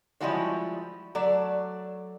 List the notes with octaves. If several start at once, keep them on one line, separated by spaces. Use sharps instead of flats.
F3 G3 G#3 E4 F#4 C#5
F#3 A3 D5